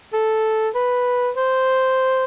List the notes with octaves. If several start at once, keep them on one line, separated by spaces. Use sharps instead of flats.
A4
B4
C5